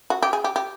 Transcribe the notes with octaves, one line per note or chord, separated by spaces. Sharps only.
F#4
G4
G#4
G4
G4